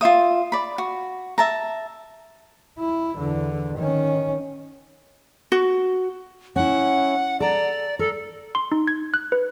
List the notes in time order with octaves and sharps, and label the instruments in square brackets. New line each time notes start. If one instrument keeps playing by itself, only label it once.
[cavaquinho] F4 C#5 E5 D#6
D5 B5
F#4
E5 A5 A#5
[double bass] E4
E2 D3
D#3 C#4
[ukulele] F#4
[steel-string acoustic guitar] C#4 E4 [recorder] F#5
[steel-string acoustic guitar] A4 A#5 [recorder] D5
[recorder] A4 [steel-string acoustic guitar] A#4
[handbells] C6
D#4
G#6
F#6
B4